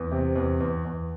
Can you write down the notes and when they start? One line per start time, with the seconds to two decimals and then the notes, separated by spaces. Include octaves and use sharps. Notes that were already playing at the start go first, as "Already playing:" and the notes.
Already playing: E2
0.12 C3
0.36 E2
0.60 E2
0.85 E2